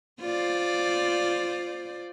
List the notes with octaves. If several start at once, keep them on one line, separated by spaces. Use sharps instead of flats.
F4 C5 D5